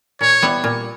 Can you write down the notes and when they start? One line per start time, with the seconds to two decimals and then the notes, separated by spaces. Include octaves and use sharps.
0.21 A#2 C#5
0.42 G3 B3 E4
0.64 A#2